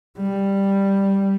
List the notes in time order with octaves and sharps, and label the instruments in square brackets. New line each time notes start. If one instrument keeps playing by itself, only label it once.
[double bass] G3